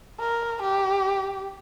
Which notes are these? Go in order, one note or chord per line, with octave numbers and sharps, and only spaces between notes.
A#4
G4